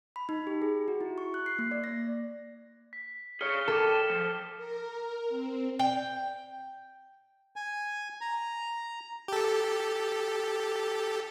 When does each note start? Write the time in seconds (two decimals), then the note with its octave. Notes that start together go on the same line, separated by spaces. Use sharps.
0.16 B5
0.29 D#4
0.47 G4
0.62 G#4
0.88 F#4
1.01 E4
1.18 C#6
1.34 F#6
1.46 C7
1.59 A#3
1.71 D5
1.84 A#6
2.93 B6
3.41 G#4 C#5 F6 C#7 G7
3.68 A4 G5 A5 D6 E7
4.10 F3
4.57 A#4
5.29 C4
5.79 G5
7.56 G#5
8.21 A#5
9.28 G4 A4